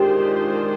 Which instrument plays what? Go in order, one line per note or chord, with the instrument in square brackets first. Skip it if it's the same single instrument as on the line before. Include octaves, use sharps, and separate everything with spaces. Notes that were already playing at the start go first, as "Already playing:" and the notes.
Already playing: [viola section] D#3 G#3 D4 F4 C5 [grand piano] G4